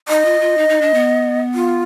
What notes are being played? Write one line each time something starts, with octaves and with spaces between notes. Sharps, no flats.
D#4 D#5
F4
F4
D#4
D#4
D4
B3
F4